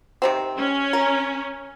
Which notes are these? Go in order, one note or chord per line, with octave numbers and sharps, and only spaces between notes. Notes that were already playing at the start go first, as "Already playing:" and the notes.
C3 D#3 C4
C#4
A#4